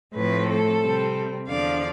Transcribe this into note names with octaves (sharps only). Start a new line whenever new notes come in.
A2 F3 A3 C4 B4
A4
C3 G3 C4
E2 D3 F3 D5 F5